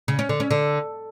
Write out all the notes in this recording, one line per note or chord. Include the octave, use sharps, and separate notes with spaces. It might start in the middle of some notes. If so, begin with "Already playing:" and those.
C#3
C#4
D3
C#4
D3